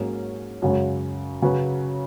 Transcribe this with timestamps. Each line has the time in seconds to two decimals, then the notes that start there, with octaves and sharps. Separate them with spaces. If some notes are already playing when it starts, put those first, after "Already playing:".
Already playing: G#2 F#3 A#3 C#4 G#4
0.62 F#2 C#3 G#3
1.42 C#3 F#3 C#4 F#4 B4